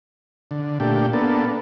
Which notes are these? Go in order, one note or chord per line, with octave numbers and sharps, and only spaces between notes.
D3
A#2 A3 D4 G4
A#3 B3 D4 A4